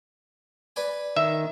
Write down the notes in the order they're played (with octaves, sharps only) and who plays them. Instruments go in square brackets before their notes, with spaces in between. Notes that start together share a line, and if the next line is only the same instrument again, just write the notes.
[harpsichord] B4 D5 G#5
[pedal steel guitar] D#3 [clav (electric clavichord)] E5